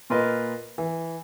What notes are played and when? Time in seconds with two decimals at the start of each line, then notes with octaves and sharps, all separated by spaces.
0.10 A#2 F4 A#4 B4 D#5
0.78 E3